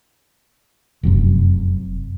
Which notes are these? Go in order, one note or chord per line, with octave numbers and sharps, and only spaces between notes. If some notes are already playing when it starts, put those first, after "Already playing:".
F1 F#2 C3